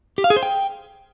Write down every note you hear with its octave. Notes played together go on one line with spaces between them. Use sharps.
G4
F5
G#4
C5
G5